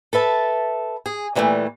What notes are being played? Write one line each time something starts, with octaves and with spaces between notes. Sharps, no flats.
A4 B4 E5 A5
G#4
A#2 E3 F#3 G3 A3